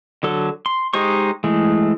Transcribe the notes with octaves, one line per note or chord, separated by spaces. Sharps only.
D3 F#3 A4
C6
G#3 D#4 G4 C5 C#6
E3 G#3 A3